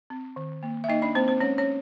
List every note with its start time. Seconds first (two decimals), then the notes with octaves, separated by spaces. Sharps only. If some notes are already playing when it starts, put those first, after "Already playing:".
0.10 C4
0.36 D#3
0.63 A#3
0.84 E5
0.88 A#3 D#4 D#5
1.02 D4 D5
1.15 A#3 C4 C5
1.28 C4 C5
1.40 G#3 C#4 C#5
1.58 C#4 C#5